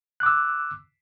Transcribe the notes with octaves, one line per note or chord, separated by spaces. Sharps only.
D6 E6 F#6